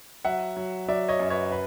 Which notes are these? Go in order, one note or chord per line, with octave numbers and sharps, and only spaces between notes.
F#3 E5 F#5
F#3
F#3 D5 E5
C#5 D#5
F#2
B4 C#5
B4